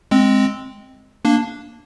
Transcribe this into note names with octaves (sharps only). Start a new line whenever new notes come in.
G#3 C4
A#3 D4